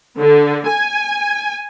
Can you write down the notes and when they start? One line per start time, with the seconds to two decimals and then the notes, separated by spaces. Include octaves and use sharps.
0.18 D3
0.67 G#5